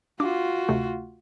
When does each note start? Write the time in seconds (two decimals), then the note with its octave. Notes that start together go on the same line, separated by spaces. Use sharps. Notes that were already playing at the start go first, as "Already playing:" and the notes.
0.20 D4 F4 F#4 D6
0.69 D2 C3 A3